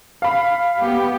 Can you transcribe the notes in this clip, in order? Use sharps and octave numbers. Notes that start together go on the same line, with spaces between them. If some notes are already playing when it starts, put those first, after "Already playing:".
F5 B5
B3 G4